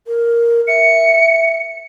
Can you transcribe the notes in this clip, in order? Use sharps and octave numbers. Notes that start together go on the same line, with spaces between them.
A#4
E5 C#7